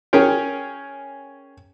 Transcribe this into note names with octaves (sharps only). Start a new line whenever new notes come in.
C#4 G#4 A#4 C#5 G5